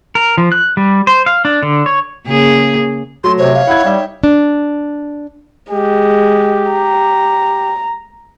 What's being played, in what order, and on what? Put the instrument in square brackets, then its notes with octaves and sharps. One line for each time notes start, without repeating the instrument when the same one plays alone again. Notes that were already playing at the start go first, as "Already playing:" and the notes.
[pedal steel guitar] A#4
F3
F#6
G3
C5
F5
D4
D3
C#5
[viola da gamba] C#3 A#3 G#4
[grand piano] F#3 A3 [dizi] C6
[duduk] C3 [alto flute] C5 [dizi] C#5
[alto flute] F5
[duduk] E4 [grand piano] F#5 G#6
[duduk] G3 [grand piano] D#4 E5 G5
[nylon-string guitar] D4
[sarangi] G#3 [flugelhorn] G4
[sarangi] A#5